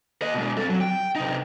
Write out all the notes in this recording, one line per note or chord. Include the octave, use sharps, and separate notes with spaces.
A#3 D#5
B2 G#3
C4 A4
F#3
G5
C3 D#4